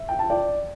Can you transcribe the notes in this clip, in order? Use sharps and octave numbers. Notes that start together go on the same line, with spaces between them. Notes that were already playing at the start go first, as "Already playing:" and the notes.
Already playing: E5
G5
A5
D5 G5